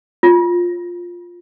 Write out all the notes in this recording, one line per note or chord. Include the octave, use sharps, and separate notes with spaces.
F4